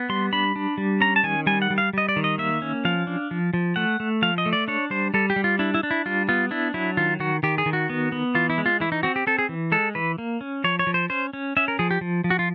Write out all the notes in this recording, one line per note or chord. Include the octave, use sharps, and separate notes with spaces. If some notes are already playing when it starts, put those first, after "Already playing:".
Already playing: B3
G3 C6
D4 B5
D4
G3
C#4 A#5
A5
D#3 G#5
G3 G#5
F#5
G3
F5
G3 D#5
D5
D#3
D#5
A#3 E5
C#4
F3 F5
D4
F3
F3
A3 F#5
A3
F3 F5
D#5
A3
D5
D4 C#5
G3 C5
G3 A4
G4
G3
F4
D4 E4
E4
D4
E4
G3 F4
B3 F4
D4 E4
F#3 E4
D#3 F4
D#3 F#4
D#3 G4
G#4
D#3
F#4
B3
B3
E3 F4
E4
G#3
F4
E3 E4
D#4
C4 F#4
G4
C4 A4
G#4
E3
G#3 A4
E3 B4
A#3
C#4
F3 C#5
C#5
F3
C5
C#4 C5
C#4
C#4 E5
A#4
F3 G#4
G4
F3
F3
F#4
F4